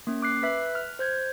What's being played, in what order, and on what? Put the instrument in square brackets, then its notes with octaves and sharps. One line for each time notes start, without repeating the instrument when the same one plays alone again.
[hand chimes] A#3 C#4
[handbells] D6 F#6 C7
[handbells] B4 E5 [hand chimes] F#6 B6
[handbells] F6
[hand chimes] C5 G6 G#6